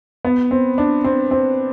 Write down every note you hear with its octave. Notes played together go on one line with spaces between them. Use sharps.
B3
C4
D4
C4
C4